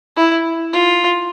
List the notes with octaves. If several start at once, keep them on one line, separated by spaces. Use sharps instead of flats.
E4
F4